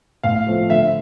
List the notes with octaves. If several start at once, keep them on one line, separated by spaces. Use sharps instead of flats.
A2 F5
F3 A3 C4
D3 E5